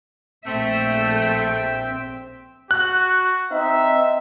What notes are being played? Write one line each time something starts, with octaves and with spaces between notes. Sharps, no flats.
A#1 A3 C4 E5 G5
F#4 F#6
C4 D#4 E5